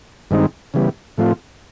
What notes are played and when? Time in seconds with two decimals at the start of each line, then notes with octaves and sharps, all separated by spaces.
0.31 G2 D#3 G#3 C4 D#4
0.74 C#3 E3 G3 B3
1.17 A2 F3 A3 C4 F4